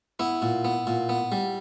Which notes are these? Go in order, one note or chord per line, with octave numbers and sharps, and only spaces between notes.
B3 E4
A#2
B3
A#2
B3
G3